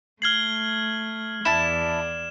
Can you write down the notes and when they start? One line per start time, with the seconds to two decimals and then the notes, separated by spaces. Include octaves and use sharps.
0.22 A3 F6 G#6 C7 F#7 G7
1.45 E2 E4 D5 A5 E7